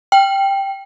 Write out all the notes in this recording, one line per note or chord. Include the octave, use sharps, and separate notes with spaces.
G5